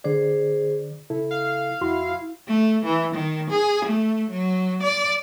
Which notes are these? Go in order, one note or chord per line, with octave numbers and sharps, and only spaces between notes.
D3 G#4 C5 D5
C#3 E4 A4
F5
F2 E4 F#4 C6
A3
E3
D#3
G#4
A3
F#3
D5